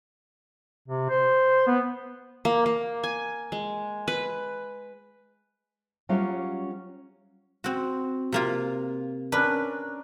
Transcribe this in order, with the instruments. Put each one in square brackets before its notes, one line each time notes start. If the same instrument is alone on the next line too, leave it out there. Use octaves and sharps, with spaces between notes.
[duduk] C3
C5
B3
[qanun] A#3
A#3
G#5
G#3
B4
[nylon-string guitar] F#3 G3 C#4 F4 A#4 F5
[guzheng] C4 F#4
C3 A#3 F4
[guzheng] C#4 B4 [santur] D4 A#4